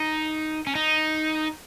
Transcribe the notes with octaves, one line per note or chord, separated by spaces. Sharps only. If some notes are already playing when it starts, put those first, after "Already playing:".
Already playing: D#4
C#4
D#4